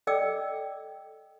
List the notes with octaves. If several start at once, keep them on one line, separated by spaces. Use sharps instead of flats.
A4 D5 D#5 G5 D6 E6